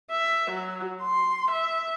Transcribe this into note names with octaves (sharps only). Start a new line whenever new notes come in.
E5
F#3
C6
E5